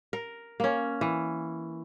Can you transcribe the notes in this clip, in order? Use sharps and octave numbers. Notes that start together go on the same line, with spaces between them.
A#4
A#3 C#4
E3